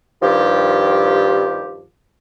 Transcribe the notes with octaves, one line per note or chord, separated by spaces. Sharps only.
G2 D#3 F3 G4